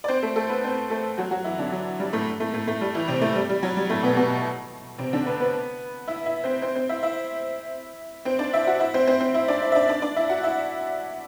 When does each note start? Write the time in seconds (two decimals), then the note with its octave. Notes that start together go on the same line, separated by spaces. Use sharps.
0.04 D5
0.08 C4 C5
0.23 A3 A4
0.36 A3 A4
0.49 B3 B4
0.64 C4 C5
0.90 A3 A4
1.18 F#3 F#4
1.31 F#3 F#4
1.44 E3 E4
1.58 D3 D4
1.72 F#3
2.00 G3
2.13 A2 A3
2.40 A2 A3
2.54 A2 A3
2.67 A2 A3
2.81 G3
2.95 E3 E4
3.08 C3 C4
3.21 A2 A3
3.35 G3
3.49 G3
3.63 F#3
3.77 G3
3.89 A2 A3
4.03 B2 B3
4.17 B2 B3
4.98 C3 C4
5.13 D3 D4
5.26 B3 B4
5.40 B3 B4
6.08 E4 E5
6.26 E4 E5
6.44 C4 C5
6.62 C4 C5
6.75 C4 C5
6.89 E4 E5
7.03 E4 E5
8.25 C4 C5
8.39 D4 D5
8.53 E4 E5
8.67 F#4 F#5
8.80 E4 E5
8.94 C4 C5
9.07 C4 C5
9.20 C4 C5
9.34 E4 E5
9.48 D4 D5
9.62 E4 E5
9.72 E5
9.75 D4 D5
9.89 D4 D5
10.02 D4 D5
10.16 E4 E5
10.29 F#4 F#5
10.43 E4 E5